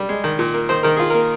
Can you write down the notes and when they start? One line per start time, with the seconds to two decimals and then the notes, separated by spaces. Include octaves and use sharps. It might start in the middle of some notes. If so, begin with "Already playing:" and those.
Already playing: G3
0.09 G#3
0.24 D#3
0.39 A#2
0.54 A#3
0.69 D#3 C5
0.83 D#3 A#4
0.97 F4 G#4
1.10 A#4
1.14 A#3